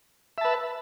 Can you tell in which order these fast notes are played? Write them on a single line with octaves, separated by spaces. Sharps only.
E5 A5 B4